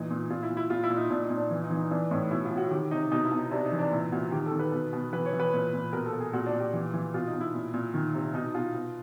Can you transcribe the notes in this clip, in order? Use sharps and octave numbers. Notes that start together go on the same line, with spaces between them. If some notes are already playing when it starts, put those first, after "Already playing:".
Already playing: A#2 E3 D#4
A#2
A#2 F4
E4
A#2
E4
A#2 F4
E4
A#2
D#4
A#2 D4
D#4
A#2
D4
E3
D#4
E3
D#4
E3 D4
A2 D#4
B2 E4
F4
B2
F#4
D#3 G4
C3 D#4
B2 D#4
E4
B2
D#4
C3 D4
D#4
E3
D4
A#2 E4
A#2 F#4
D#3 G4
A4
D#3
B4
B2
B2
E3 B4
C#5
E3
B4
A#2
A#2
B2 A#4
A4
B2
G#4
A#2 F#4
D4
A#2
G4
E3
E3
B2 F4
D#4
B2
E4
A#2
A#2
D#3
C3
B2 D#4
B2 F4
B2